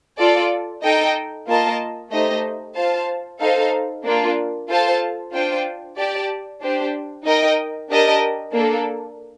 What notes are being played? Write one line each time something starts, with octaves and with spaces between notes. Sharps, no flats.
F4 A4 D5
D#4 A4 D#5 G5
A#3 F4 A#4 D#5 A5
A3 D#4 G4 C5 D#5
F4 C5 F5 A5
D#4 A4 C5 F5
A#3 D4 F4
F4 A4 C5 F5 A5
D4 F4 C5 G5
G4 D5 A5
D4 G4 C5
D#4 A#4 D#5 G5
D4 G4 A#4 D#5 A5
A#3 D4 A4